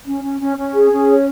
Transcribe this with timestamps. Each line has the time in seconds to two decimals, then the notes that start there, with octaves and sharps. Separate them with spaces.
0.05 C#4
0.22 C#4
0.40 C#4
0.57 C#4
0.73 G#4
0.91 C#4
1.08 C#5